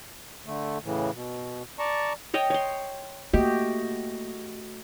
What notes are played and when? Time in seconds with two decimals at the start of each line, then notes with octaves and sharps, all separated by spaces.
0.47 D3 A3
0.85 A2 C#3 E3
1.14 B2
1.79 D5 A5 A#5 C#6
2.34 C#5 D#5 G5
2.50 C#5 C6
3.33 A3 A#3 F#4 G4 D#5